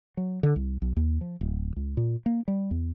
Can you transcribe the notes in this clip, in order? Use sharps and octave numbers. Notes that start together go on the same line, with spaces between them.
F#3
D3
C2
B1
D#2
F3
D1
C#2
A#2
A#3
G3
E2